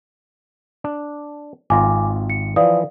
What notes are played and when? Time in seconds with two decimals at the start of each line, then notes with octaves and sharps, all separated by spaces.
0.84 D4
1.70 G#1 F4 G#5 A#5 D6
2.30 C#7
2.56 E3 F3 D5 F5 D#6